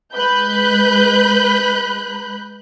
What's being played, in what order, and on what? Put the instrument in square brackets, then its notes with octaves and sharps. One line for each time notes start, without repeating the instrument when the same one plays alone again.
[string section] G#3 B4 B5 F#6 G6